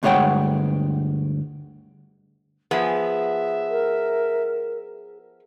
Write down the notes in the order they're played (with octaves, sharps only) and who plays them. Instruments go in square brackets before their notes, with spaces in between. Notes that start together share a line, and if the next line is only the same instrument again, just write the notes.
[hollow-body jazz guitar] D2 G2 G#3 C#5 F#5 G5
[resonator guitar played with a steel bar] F3 B3 [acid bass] G#4 [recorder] E5
[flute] A#4